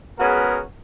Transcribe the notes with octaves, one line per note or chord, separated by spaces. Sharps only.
G#3 B3 C#4 F#4 G#4 A#4